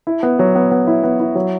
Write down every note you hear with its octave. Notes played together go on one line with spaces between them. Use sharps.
E4
B3
F#3
B3
B3
E4
B3
E4
F#3